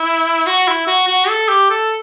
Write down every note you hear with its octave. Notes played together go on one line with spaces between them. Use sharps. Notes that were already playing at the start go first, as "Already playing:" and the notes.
Already playing: E4
F#4
E4
F#4
F#4
A4
G4
A4